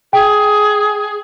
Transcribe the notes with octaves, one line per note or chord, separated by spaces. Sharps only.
G#4 G5